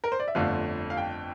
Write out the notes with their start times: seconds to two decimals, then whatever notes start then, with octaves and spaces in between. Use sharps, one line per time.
0.04 A#4
0.12 C5
0.19 D5
0.28 E5
0.35 G1 F2 D3 A3 F5
0.90 F5
0.97 G5